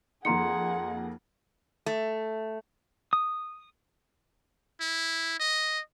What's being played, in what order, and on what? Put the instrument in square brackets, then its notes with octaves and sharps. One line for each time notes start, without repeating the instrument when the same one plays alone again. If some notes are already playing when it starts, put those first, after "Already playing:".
[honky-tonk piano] F2 A#3 D#4 [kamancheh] G#4 F#5 [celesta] A#5 C6 C#7
[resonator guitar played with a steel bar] A3
[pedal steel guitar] D#6
[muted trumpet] E4
D#5